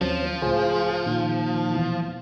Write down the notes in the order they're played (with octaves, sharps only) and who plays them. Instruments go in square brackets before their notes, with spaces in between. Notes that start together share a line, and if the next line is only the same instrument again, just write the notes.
[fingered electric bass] D#2 F#3 [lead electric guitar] F3 [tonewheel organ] C4 C#4
[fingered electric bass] C#2 A2 [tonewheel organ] F4 G#4 C5
[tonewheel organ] A#2 D#3
[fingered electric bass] E1 B2 E3